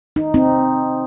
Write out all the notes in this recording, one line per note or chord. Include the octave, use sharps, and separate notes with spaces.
D#4
C4 D#4